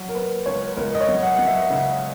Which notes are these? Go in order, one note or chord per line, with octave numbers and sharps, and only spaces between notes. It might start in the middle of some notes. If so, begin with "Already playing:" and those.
Already playing: F#3
A#4
A#3 B4
C#2 C#5
C#2 A#4
D#5
C#5
F#3
F#5
F#3 F#5
E5
C#3